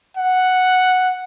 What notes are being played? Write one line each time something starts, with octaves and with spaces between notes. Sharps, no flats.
F#5